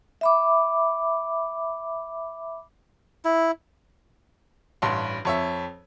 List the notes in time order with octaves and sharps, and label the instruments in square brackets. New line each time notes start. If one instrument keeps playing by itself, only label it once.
[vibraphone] E5 B5 D6
[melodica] E4
[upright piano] A1 G2 C#5 A5 C6
F2 C#5 E5